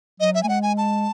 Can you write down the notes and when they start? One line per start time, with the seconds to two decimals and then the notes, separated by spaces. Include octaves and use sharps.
0.20 F#3 D#5
0.35 E5
0.43 A3 G#5
0.49 G#3 F#5
0.63 G#5
0.78 A5